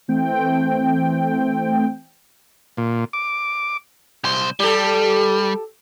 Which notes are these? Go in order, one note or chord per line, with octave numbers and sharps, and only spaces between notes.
E3 A3 C4 G5
A#2
D6
C2 C5
G3 G4 A4